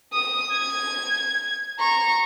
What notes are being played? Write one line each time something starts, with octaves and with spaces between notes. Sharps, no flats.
D#6
G#6
A#5 C#6